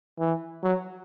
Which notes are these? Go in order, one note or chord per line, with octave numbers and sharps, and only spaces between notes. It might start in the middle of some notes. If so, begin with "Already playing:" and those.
E3
F#3